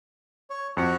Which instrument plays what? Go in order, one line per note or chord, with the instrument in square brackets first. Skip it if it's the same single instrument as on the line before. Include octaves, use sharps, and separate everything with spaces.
[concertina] C#5
[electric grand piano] F2 C#7 [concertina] F#4 F#5